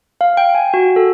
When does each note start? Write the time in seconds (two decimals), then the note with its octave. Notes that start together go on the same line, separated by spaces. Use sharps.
0.21 F5
0.37 G5
0.55 G#5
0.74 F#4
0.96 A4